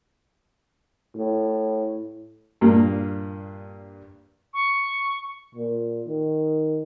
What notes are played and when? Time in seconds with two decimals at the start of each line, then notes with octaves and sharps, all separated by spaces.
1.16 A2
2.61 G2 A#2 A#3
4.54 C#6
5.55 A#2
6.07 D#3